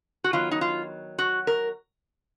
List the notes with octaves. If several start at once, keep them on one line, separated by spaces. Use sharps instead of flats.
F#4
D#3 F#3 B3 F4
D#4
F4
F#4
A#4